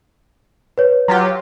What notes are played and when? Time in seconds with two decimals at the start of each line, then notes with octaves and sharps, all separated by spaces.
0.78 B4 C#5
1.08 F#3 F4 G4